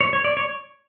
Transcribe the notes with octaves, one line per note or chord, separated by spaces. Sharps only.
C#5
C#5
D5
C#5